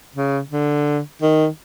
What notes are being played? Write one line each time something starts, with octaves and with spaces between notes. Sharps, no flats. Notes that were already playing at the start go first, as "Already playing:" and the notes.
C#3
D3
D#3